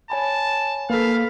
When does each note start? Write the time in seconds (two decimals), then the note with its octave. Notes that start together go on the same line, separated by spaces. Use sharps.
0.10 C#5 G#5 A5 B5
0.90 A#3 A4 B4 F5 B5 B6